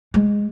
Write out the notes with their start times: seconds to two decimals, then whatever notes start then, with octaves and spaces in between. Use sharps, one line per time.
0.14 G#3